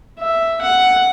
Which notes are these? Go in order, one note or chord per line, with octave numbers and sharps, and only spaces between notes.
E5
F#5